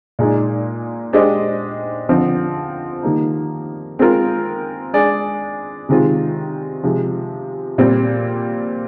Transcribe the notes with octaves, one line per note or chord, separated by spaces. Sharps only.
A#2 G#3 D#4 G#4 D5
G#3 D4 G4 C5 D#5
D3 F3 C4
D#3 G3 A#3 D#4
G#3 C4 F4 A#4
G#3 D4 G#4 D5
C3 D#3 G#3 C4 F4
C3 F3 G#3
A#2 G3 C4